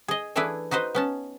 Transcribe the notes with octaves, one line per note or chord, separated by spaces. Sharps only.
G#4 D#5
E3 A3 D4 E4 G#4 B4
D#4 F#4 B4 C5 D#5
B3 C#4 A5